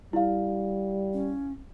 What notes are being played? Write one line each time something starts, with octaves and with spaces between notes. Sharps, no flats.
G3 E4 F5
C#4